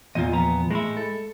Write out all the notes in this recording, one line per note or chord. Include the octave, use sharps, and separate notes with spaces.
E2 A#2 F4 D#5
F3 B3 A#5
A2 G#3 E4
A4